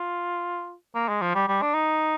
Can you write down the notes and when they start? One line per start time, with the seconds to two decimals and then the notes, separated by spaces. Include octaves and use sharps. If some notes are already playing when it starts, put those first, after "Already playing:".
Already playing: F4
0.95 A#3
1.09 G#3
1.21 F3
1.35 G3
1.48 G3
1.62 D4
1.74 D#4